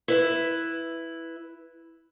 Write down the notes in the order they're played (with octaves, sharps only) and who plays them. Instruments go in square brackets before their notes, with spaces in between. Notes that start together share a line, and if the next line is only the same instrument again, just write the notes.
[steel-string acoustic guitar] E4 B4 E5